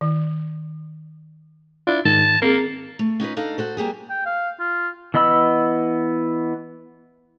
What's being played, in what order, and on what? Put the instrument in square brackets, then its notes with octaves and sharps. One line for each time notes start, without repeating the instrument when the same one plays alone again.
[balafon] D#3
[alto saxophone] D4 [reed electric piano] E4 F4
[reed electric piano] G#2 D#3 [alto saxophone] A5
[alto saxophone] A#3 [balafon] C4 G#4 [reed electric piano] A#4
[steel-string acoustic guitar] A3
C#4 D#4 F4 B4
D4 D#4 A4 F5
F#4 A4 C5
G3 A#3 G4 G#4
[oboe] G5
F5
F4
[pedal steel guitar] E3 B3 D#5 B5 E6